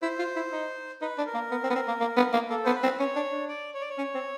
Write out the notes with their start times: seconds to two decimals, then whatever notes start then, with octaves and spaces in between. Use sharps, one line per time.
0.02 E4 C5
0.19 F4
0.36 E4
0.52 D#4
1.01 D#4 B4
1.18 D4
1.26 A#4
1.34 A#3
1.51 B3
1.63 C4
1.70 B3
1.75 C4
1.88 A#3
2.00 A#3
2.17 B3
2.33 A#3
2.49 A#3 A4
2.64 B3 C5
2.75 B4
2.83 C4
2.99 C#4 C#5
3.16 D4
3.32 D4
3.48 D5
3.74 C#5
3.81 D5
3.89 C#5
3.98 C#4
4.15 C4